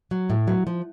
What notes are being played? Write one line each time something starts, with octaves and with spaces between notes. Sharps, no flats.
F#3
A2
F#3
F3